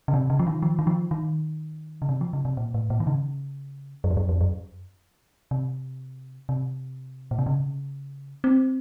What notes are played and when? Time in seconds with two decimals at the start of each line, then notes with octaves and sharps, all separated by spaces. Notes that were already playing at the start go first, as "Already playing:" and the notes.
0.08 C#3
0.14 C3
0.30 C#3
0.39 F3
0.47 D#3
0.62 F3
0.79 D#3
0.87 F3
1.11 D#3
2.02 C#3
2.09 C3
2.21 F3
2.33 C#3
2.45 C3
2.57 A#2
2.74 A2
2.90 A#2
3.00 D#3
3.07 C#3
4.04 F#2
4.11 F2
4.17 F#2
4.29 F2
4.41 F#2
5.51 C3
6.49 C3
7.31 A#2
7.39 C3
7.46 C#3
8.44 C4